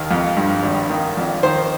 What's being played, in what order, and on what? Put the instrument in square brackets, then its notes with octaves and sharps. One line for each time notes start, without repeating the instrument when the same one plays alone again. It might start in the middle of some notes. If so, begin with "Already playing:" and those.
Already playing: [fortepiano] D#2 D#3 A#4
F2
G2
G#1
D#3
F2
D#3 C5